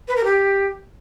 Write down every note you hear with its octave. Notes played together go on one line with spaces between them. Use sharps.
B4
A#4
G4